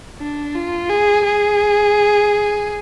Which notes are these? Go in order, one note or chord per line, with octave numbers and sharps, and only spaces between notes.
D4
F4
G#4
G#4